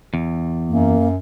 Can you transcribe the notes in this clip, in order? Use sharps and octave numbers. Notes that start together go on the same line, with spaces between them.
E2
F#2 A#3